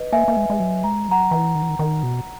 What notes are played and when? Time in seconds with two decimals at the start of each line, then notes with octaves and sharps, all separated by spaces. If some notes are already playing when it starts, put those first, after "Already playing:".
Already playing: B4 D#5
0.12 A#3 E5 G#5
0.28 A#3
0.37 G#3
0.50 G#3
0.60 F#3
0.84 G#3 A#5
1.08 F#3 F#5 A#5
1.31 E3
1.55 D#3
1.62 E3
1.69 D#3
1.79 D#3
2.03 B2